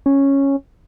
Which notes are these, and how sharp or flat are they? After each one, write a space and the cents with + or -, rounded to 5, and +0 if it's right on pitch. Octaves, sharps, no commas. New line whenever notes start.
C#4 -5